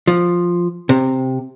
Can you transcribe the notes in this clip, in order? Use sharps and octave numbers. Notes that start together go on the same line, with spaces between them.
F3
C3